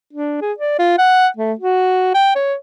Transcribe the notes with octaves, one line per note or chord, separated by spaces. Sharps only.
D4
G#4
D5
F4
F#5
A3
F#4
G5
C#5